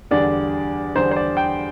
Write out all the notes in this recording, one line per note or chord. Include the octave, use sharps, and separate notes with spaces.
E2 D3 G3 D4 D5
E2 D3 G3 D4 C5
C5
D5
G5